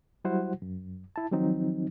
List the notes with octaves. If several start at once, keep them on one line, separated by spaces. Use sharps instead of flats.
F#3 G3 E4 F#4 C5 F#5
F#2
E4 A5
D#3 F3 F#3 C4 D#4